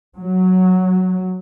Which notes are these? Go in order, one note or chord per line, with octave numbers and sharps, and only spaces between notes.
F#3